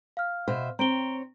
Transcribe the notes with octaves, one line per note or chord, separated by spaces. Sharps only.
F5 F6
B2 C5 E5
C4 C#5 A#5 D7 G7